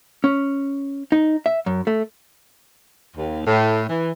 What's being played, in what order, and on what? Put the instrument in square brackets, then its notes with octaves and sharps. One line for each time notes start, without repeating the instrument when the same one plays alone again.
[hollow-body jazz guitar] C#4
D#4
E5
F#2
A3
[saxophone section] D#2
A2
E3